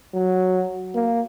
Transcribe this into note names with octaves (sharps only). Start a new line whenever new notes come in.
F#3
A#3